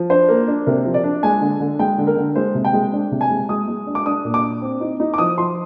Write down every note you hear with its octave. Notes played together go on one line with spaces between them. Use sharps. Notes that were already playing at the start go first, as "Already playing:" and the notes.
Already playing: F3
D4 C5
A#3
D4
C3 A#4
F3
D5
D4
G#3 G#5
D3
D3
G#3 G5
D3
A#4
D3
G#3 C5
C3
G5
G#3
D4
C3
G#5
G#3
G#3 D#6
G#3
D4
D6
D4 D#6
A#2
D6
D4
C4
D#4
D#4
D6
F3 D#6
F3 C6